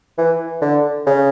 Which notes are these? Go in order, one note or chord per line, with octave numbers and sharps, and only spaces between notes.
E3
D3
C#3